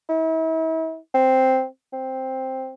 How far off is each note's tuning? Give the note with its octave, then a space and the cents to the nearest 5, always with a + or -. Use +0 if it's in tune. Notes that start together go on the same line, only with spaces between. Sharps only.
E4 -40
C4 +0
C4 +5